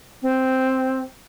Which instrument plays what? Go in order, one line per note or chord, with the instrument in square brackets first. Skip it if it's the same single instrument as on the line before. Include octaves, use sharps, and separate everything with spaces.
[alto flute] C4